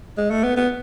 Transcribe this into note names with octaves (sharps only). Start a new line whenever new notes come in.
G#3
A3
B3
B3